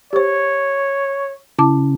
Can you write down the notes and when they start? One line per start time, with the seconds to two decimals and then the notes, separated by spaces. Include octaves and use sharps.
0.13 G4 C5 C#5
1.59 C#3 E4 A5 D6